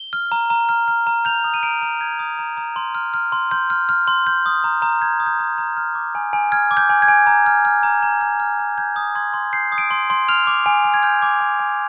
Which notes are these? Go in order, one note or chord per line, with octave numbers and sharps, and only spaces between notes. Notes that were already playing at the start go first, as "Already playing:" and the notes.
Already playing: G7
F6
A#5
A#5
F6
F6
A#5
G6 F7
D#6
D#7
A#5 D7
A#5
G6 G#6
D#6
A#5
A#5
C6
F6
F6
C6
C6 G6
F6
F6
C6
G6
D#6
A#5
A#5
G6 G#6
D#6
G6
A#5
A#5
F6
D6
G#5
G#5
F6 G#6
D6
G6
G#5
G#6
G#5
A#5
F6
F6
A#5
A#5
F6
F6
A#5
G6 G#6
D#6
C6 G#6
C6
G6 C7
D#6
D7
C6
C6
F6 F7
D6
G#5
G#5
G#6
F6 G6
D6
G#5
G#5